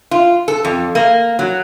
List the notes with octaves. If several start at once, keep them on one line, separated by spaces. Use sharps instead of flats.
F4
A4
F2
A#3
F#3